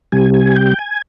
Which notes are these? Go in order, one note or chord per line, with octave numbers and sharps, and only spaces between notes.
C3 G3 G#5
G#5
G5
G#5